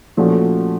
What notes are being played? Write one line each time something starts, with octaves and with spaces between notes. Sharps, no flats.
A#2 F3 A3 C#4 F#4